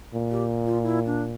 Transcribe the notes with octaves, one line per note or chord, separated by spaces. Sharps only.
A#2
G4
F4
E4
D4